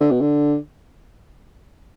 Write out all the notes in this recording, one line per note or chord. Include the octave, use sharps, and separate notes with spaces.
D3
B2
D3